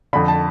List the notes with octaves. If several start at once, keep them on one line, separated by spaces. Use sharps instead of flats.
F2 D3 B5
A5